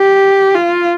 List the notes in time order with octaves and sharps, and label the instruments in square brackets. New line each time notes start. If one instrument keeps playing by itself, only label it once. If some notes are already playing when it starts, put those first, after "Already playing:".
Already playing: [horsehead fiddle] G4
F4